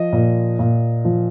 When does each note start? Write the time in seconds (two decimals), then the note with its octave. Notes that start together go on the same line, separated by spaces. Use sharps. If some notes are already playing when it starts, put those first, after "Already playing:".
Already playing: F3 D#5
0.13 A#2
0.59 A#2
1.05 F3